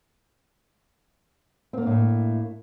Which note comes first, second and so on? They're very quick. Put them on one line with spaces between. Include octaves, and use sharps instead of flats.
C4 A#3 D4 A2 A3